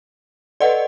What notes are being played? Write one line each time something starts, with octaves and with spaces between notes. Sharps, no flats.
A4 B4 D5 D#5 F#5